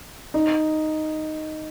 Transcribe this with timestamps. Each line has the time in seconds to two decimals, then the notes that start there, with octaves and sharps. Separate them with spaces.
0.34 D#4